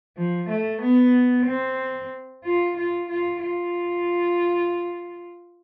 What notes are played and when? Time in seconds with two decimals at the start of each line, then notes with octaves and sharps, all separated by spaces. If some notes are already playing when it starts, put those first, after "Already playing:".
0.17 F3
0.49 A3
0.82 B3
1.47 C4
2.44 F4
2.77 F4
3.09 F4
3.42 F4